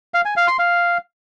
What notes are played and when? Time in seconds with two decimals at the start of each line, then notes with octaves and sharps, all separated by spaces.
0.14 F5
0.25 G#5
0.37 F5
0.48 C6
0.59 F5